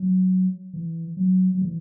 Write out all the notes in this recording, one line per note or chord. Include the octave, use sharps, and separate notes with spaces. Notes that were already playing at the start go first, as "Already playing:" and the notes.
Already playing: F#3
E3
F#3
F#3
E3